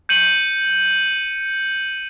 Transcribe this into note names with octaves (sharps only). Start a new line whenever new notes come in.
G6 C#7 D#7 F#7